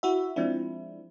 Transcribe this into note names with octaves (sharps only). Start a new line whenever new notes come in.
E4 F#4 E5
F3 G#3 C4 D4 E4